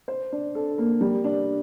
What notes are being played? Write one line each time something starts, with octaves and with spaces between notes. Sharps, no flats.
C5
D4
A4
A#3
G3
D4